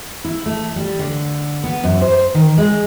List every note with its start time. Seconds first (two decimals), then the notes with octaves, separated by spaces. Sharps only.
0.25 E4
0.46 A3
0.76 G3
0.99 D3
1.64 B3
1.84 F#2
2.01 C5
2.34 D#3
2.57 G#3